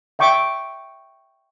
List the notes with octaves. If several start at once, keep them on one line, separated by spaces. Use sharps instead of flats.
E5 G5 C#6 D6